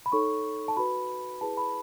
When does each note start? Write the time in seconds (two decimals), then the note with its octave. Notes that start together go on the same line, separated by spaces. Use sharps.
0.06 B5
0.12 D#4 A4 C#5 C#6
0.68 A5
0.77 F#4 B4 B5
1.41 E4 G#4 B4 A5
1.57 B5